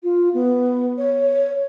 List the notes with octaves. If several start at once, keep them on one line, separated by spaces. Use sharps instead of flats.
F4
B3
C#5